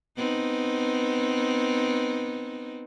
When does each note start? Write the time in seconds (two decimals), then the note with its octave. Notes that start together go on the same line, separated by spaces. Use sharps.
0.18 B3 C4 D#4